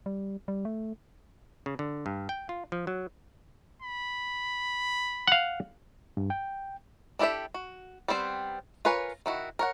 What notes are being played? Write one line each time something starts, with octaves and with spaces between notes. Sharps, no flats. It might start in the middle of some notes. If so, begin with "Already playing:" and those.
G3
G3
A3
C#3
D3
G2
G5
F4
F3
F#3
B5
F5 F#5
G2
G5
D4 E4 G4 A4 E5
F#4
G3 B3 C4 C5
F4 A#4 B4 C#5 G#5
D#3 E4 F#4
A#4 C#5 F#5